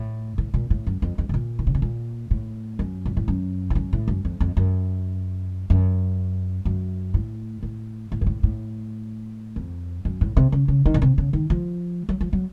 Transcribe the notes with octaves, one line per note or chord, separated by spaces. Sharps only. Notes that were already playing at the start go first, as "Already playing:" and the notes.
Already playing: A2
A2
A#2
A2
F#2
F2
F2
A2
A#2
D#3
C#3
C3
A#2
A2
F#2
A#2
A2
F#2
A2
F#2
A2
F#2
F2
F2
F#2
F#2
F#2
A2
A2
A2
F#2
A2
A2
F2
F#2
A2
C3
C#3
C#3
D#3
A#2
C3
C#3
D#3
F3
F#3
F3
F#3